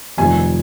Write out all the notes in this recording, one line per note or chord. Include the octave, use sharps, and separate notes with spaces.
F1 F2 C3 D#3 G3 G#5